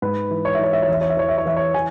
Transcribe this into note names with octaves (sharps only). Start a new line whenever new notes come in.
G#2 B4
E3
C#5
E5
E3 C#5
E5
C#5
E2 E5
C#5
E5
E3 C#5
E5
C#5
E3 E5
C#5
E3 G#5